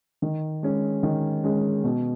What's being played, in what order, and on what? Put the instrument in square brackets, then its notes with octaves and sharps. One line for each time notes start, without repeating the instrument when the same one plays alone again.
[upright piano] D#3
G#3 C#4
D#3
G#3 C#4
B2